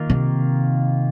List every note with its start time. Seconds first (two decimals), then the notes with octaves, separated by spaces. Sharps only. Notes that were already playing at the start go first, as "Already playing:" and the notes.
Already playing: D#3 A#3 F4
0.10 C3